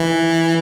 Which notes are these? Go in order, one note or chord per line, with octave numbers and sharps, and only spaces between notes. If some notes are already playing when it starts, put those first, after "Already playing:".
Already playing: E3